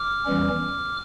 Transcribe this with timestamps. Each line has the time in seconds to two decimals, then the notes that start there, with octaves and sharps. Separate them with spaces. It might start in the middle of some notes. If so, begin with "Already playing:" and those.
Already playing: D6 F6
0.26 E2 E3 G3 C#4